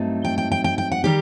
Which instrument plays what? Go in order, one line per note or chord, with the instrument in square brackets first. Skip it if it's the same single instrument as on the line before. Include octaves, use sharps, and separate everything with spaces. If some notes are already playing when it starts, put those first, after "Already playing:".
Already playing: [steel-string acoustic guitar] G2 F#3 A3 C4 D#4
G5
G5
G5
G5
G5
F#5
D#3 G3 G4